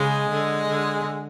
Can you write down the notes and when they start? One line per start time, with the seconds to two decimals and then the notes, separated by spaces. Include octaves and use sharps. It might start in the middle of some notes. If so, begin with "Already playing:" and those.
Already playing: C#3 G#3
0.30 D3
0.69 D3